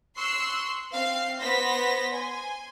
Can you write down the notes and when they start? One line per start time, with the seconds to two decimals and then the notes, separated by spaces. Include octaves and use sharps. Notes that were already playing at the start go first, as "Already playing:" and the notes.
0.16 C6 C#6 E6 F#6 C7
0.92 C4 F5 C7
1.41 B3 C5 A#6 B6
2.11 G#5 C6